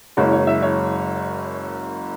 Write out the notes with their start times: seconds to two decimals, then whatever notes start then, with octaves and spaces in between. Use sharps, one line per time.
0.17 F#1 F#2 E3 G#3 C#5
0.32 C#5
0.47 E5
0.62 C#5